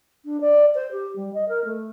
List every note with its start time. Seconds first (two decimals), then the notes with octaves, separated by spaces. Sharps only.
0.25 D4
0.41 D5
0.75 C5
0.91 G4
1.16 G3
1.34 D#5
1.48 A#4
1.65 A3